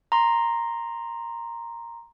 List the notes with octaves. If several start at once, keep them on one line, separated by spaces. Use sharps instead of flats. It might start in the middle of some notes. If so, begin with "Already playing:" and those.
A#5 C6